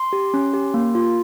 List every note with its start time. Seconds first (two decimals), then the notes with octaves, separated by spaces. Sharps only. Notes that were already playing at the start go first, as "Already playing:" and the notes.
Already playing: C6
0.13 G4
0.34 C#4
0.54 G4
0.74 A#3
0.95 F4